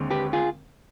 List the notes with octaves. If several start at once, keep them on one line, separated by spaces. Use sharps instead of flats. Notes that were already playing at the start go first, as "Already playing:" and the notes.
Already playing: D#2 D3 G#3 C4
G4 B4
F4 G#4